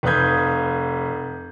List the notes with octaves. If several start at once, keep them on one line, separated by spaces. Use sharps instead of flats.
F1 B4 F5 D#6 G6 G#6